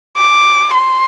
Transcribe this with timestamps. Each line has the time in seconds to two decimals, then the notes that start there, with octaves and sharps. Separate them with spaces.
0.17 D6
0.74 C6